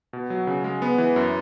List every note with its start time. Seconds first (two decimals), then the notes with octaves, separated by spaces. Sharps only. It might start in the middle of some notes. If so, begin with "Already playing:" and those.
0.13 B2
0.30 F#3
0.47 C#3
0.64 G#3
0.82 B3
0.98 E3
1.16 F#2